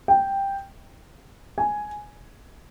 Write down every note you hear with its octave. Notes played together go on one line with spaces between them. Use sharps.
G5
G#5